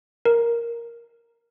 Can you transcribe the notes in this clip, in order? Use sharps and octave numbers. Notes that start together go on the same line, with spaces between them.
A#4